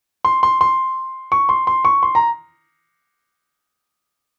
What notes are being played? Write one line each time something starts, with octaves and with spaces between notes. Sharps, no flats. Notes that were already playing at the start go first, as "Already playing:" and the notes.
C6
C6
C6
C#6
C6
C6
C#6
C6
A#5